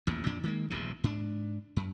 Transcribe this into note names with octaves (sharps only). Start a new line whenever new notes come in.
A1 D#2 A#2
F2 A#2 D4
D#3 G#3 A#3
D#1 A#1 E2 C3
G#2 D4
F#2